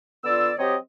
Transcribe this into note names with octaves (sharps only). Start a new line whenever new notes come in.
D3 B3 F4 D5 E6
F#3 C4 G4 C#5 D#5